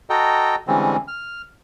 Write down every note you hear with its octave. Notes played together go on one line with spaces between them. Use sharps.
F#4 A4 D#5 G5 A#5
D3 E3 G3 G#3 C4 C#4
F6